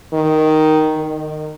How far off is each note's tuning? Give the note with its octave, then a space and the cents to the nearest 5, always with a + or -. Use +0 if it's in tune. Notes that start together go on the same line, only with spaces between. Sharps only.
D#3 +0
D#3 -25